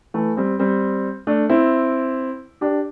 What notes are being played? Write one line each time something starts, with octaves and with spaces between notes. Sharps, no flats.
E3 A3
G3 C4
G3 C4
A3 D4
C4 E4
D4 G4